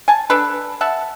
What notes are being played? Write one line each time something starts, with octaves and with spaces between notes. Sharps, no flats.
G#5 A5
D4 A4 B4
E5 F#5 A5